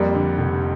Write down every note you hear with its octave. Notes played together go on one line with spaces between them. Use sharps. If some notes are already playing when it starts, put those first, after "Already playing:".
Already playing: F2 G3 A#3
D3
F1